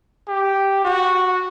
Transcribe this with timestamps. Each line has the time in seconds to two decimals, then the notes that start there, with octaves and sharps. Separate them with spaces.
0.28 G4
0.84 F#4